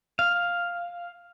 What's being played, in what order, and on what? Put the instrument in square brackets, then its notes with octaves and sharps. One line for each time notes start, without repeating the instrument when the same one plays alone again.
[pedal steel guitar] F5